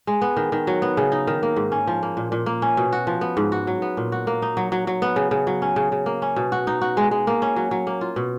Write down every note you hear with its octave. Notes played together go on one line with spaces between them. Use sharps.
G#3
B3
D#3
D#3
F#3
B3
C#3
D#4
D#3
A#3
G#2
C#4
F3
A#3
A#2
A#2
A#3
C#4
B2
F#4
F3
B3
G#2
F#4
F#3
B3
A#2
F#4
A#3
D#4
F#3
F#3
F#3
B3
C#3
C#3
F#3
C#4
C#3
C#3
A#3
C#4
B2
F#4
D#4
F#4
G#3
G#3
A#3
C#4
F#3
F#3
A#3
F4
B2